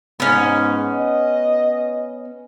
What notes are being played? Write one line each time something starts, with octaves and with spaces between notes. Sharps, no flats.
G#2 B3 C#4
D#5